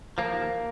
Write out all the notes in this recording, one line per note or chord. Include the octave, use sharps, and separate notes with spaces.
F3 A#3
D#2